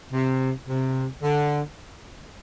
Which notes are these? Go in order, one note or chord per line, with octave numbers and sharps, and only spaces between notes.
C3
C3
D3